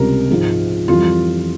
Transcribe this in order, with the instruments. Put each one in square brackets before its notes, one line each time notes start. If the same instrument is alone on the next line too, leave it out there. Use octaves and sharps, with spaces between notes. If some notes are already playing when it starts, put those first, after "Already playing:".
Already playing: [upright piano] C#2 C3 G3 [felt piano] A#4
[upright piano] G#2 F3 G#3
[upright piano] F2 E3 G3 [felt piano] F4